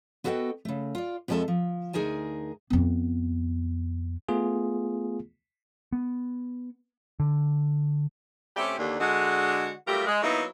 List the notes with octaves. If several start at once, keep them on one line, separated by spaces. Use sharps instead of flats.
B3 F#4 A4 D#5 E5 G5
C#3 A3
F4 D5
F2 F3 G#3 D4 A4 E5
F3
D2 D#4 G#4 A#4 G#5 A5
F2 B3
A3 B3 F4 G#4
B3
D3
C3 A3 C#4 G4
D#2 D3
D3 G#3 F#4
F#3 G3 A3 F4 G4 A#4
G#3
F#3 A#3 B3 D#4 E4